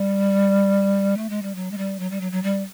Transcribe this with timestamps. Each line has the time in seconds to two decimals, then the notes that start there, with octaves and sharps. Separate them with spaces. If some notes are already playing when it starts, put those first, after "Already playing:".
Already playing: G3
1.17 A3
1.30 G#3
1.42 G3
1.55 F#3
1.71 G#3
1.78 G3
1.99 F#3
2.11 G3
2.21 F#3
2.32 F#3
2.43 G3